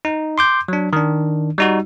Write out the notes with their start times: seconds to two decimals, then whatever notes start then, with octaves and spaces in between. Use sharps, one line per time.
0.05 D#4
0.38 C6 D6 G6
0.68 F#3 D4
0.93 D#3 D4
1.58 G3 D#4 F#4